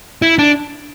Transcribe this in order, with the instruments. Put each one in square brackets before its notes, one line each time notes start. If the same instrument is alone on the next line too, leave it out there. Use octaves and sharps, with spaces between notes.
[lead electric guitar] E4
D4